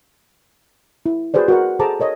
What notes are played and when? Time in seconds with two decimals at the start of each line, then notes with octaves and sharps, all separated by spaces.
1.06 E4
1.34 F#4 G#4 B4 C5 D5
1.48 F#4 A#4 F#5
1.80 G#4 A4 C5 A5 A#5 D6
2.00 A#4 C#5 D#5